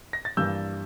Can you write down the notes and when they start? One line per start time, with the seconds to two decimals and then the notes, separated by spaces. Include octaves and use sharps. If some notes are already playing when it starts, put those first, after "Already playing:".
0.13 A#6
0.25 A6
0.37 G2 E3 G3 A#3 E6 G6